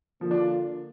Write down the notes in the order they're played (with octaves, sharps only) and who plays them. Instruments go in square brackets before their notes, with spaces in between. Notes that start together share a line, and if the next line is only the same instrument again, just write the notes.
[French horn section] D3 A#3 F4 [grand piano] F3
[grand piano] D4